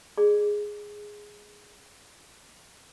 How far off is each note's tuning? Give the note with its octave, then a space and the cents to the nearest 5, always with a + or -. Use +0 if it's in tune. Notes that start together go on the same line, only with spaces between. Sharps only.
G#4 +0 D5 +45